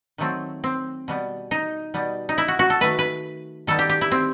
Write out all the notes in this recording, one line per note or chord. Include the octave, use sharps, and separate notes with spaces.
D#3 F#3 A3 C4
C4
B2 G3 B3
D#4
B2 G3 B3
D#4
E4
F#4
F#4
A4
D#3 A3 B4
B4
D#3 G3 B3 A4
G4
G4
E4
C4